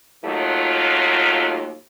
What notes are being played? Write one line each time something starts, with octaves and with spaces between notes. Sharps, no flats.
D#2 D#3 F#3 A3 F4